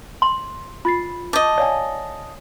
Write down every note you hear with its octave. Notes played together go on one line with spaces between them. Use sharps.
C6
F4 B5 A6 C7
D#5 A5 D6 G6
C#5 D5 F5 G#5